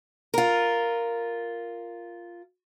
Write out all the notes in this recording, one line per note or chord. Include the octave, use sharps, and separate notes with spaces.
F4 A#4